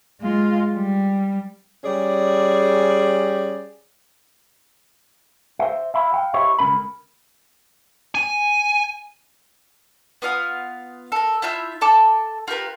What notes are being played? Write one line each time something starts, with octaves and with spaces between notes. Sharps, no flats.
G#3 F4
G3
G3 C#4 G#4 D5
C5 E5
E5 F5 B5
F5 G5
E4 G4 C5 C#5 D#5 E5
C#2 F#3 C#4 A#4 B5
G#5
B3 F4 F5 D#6
A4 A#4
E4 F4 E5 G6
A4 A5 D6
F4 G4 A#4 B4